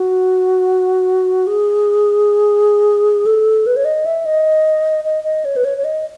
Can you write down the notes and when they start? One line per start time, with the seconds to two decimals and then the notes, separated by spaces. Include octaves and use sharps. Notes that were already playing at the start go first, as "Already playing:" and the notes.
Already playing: F#4
1.47 G#4
3.26 A4
3.66 B4
3.76 C#5
3.85 D#5
4.06 E5
4.26 D#5
5.05 D#5
5.24 D#5
5.45 C#5
5.56 B4
5.64 C#5
5.78 C#5
5.84 D#5